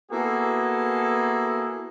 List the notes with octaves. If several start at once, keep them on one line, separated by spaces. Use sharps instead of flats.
A#3 B3 E4 F#4 G#4 A4